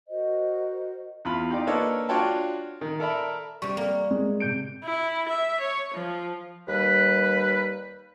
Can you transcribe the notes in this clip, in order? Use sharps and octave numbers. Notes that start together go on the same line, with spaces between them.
F#4 A#4 C5 D#5
E2 F4 B5
D#4 F4 G4 D5
A#3 D4 A4 B4 C#5 D#5
D4 F4 F#4 C#5 G5 A5
D#3
A4 A#4 D5 E5 B5
C3 G3 C#6
A#3
G#3
C3 G6 D7
E4
E5
C#5
F3
D#2 G3 B4